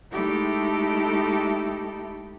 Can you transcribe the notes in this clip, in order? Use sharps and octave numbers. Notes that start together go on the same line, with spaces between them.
G#3 A3 D#4 E4 G4 A4